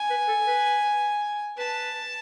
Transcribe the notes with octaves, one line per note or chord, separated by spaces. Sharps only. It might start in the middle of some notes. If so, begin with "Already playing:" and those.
Already playing: G#5
B4
A4
B4
B4 A5